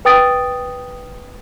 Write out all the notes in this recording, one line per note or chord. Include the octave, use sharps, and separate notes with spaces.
B4 G5 D#6 A6 D7